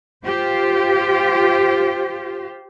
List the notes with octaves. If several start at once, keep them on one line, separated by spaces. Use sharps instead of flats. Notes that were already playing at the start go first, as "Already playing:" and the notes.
F4 G4 C5